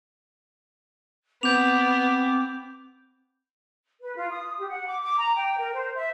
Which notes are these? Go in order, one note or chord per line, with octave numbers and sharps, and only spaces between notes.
B3 C4 D6 G6 F7
B4
F4
D#6
G4
F#5
D6
D6
A#5
G5
A#4
C5
E5